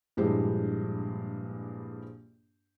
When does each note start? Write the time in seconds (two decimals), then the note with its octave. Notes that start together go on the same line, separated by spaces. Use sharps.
0.17 A#1 G2 G#3 E4 G4 C5